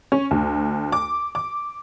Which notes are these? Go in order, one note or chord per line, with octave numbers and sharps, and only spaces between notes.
C#4
D2
D6
D6